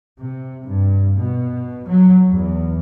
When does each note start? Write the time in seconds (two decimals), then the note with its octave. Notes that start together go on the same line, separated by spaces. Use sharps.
0.19 C3
0.65 G2
1.17 B2
1.88 F#3
2.29 E2